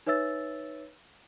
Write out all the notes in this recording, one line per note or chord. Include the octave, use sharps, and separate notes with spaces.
D#4 B4 C#5 E5 E6 A6